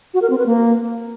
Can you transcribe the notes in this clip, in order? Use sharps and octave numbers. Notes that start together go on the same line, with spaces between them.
F#4
A#4
C4
B4
A#3